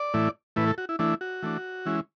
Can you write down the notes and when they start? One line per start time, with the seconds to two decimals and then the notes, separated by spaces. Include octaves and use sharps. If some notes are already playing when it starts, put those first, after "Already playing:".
Already playing: D5
0.14 A2 E3 A3 E4
0.56 A2 E3 A3 E4 B4
0.67 A4
0.78 F#4
0.89 E4
0.99 E3 A3 D4 E4
1.21 F#4
1.43 E3 A3 D4
1.86 E3 G#3 C#4 E4